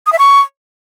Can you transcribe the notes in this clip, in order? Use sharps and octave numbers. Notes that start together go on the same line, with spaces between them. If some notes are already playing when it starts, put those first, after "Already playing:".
D#6
E5
C#6